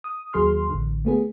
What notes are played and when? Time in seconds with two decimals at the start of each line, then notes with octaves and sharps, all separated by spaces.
0.04 D#6
0.33 D#2 F#3 G#4 C6 F6
0.70 A1 D3
1.05 A3 B3 G#4